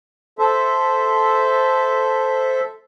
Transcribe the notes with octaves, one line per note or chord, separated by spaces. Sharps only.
A4 C5 E5